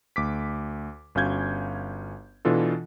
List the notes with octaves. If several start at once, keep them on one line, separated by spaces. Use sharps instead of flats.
D2 D6 B6
G1 C#4 F#4 F5 G6 G#6
B2 E3 D4 F4 A4